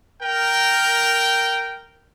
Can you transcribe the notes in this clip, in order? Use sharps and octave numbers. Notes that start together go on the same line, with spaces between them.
A#4 G5